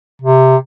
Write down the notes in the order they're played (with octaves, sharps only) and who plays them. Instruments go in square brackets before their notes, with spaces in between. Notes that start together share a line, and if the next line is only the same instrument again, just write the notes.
[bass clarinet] C3